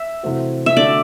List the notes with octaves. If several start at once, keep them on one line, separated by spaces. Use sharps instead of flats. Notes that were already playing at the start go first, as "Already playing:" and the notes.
Already playing: E5
C3 E3 A3 C4 F#4
E5
D3 A3 D4 F#4 D5